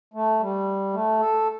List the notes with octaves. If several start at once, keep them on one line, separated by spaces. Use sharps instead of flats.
A3
G3
A3
A4